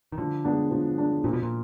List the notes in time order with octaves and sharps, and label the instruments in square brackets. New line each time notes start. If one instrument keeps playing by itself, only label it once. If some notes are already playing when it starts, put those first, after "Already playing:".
[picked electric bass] D#3
[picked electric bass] D3 [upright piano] F3
[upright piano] G#3 B3 D4
F3
G#3 B3 D4
[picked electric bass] A#2 [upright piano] F3
[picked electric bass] B2
A#2